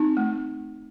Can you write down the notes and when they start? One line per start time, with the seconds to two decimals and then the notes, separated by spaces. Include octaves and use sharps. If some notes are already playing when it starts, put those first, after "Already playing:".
Already playing: C4 D#4
0.17 A3